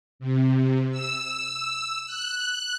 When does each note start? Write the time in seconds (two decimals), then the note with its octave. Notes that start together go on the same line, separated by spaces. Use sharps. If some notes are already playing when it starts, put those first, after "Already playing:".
0.19 C3
0.91 E6
2.06 F#6